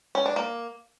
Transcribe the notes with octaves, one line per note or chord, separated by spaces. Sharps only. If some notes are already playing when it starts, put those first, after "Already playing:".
C#4
D4
A#3